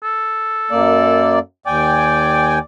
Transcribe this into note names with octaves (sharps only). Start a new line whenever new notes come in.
A4
F#2 A#3 D5
D#2 D5 G5 G#5